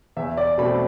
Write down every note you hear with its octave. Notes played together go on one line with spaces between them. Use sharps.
E2 E5
D5
B2 A3 C4 B5